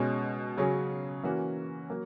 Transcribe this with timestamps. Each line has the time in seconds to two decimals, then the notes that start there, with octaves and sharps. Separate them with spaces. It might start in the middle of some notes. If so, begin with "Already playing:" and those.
Already playing: B2 G#3 C#4
0.57 C#3 F#3 C#4 G#4
1.23 E3 A#3 C#4 F#4
1.90 F#3 A#3